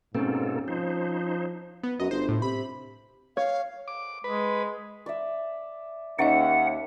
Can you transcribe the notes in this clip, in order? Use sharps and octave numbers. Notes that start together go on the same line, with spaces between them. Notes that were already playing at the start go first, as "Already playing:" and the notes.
G#2 B2 A#3 C4 C#4 A4
F3 D#4 C5
B3
F#2 D#5
G1 C5
A2
C3 B5
C#5 F5
D6
G#3 B4
D5 E5
D#2 C#4 D#4 D#5 E5 F#5